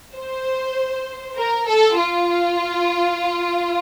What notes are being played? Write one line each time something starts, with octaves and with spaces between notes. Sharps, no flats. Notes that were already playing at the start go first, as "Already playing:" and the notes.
C5
A#4
A4
F4